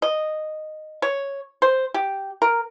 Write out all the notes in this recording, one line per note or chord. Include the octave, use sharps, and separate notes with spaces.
D#5
C#5
C5
G4
A#4